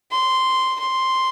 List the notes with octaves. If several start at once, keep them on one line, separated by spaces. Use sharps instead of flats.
C6
C6